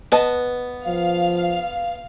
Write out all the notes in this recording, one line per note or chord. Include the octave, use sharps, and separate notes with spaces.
B3 B4 D#5 A5
F3 F5